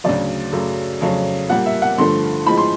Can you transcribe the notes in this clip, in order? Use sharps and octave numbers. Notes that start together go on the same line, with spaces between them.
D2 C#3 F#3 D5
F#2 C#3 F#3 A3
F2 C#3 F#3 A3 C#4
A#2 G3 A#3 F#5
E5
F#5
G2 D3 F3 A3 C6
A2 F3 G#3 B5
C6